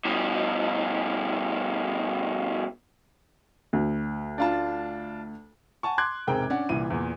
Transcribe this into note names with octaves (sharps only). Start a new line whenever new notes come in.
G2 B2
D2
D4 F4 A5
F#5 G#5 A5 C#6
C6 D6 F#6 G#6
E1 G#2 C3 G#4 A#4 G5
C#4 D4 F#5
C2 A#2 E3 D#7
E2 A#2